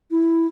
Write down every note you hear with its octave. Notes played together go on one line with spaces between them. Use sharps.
E4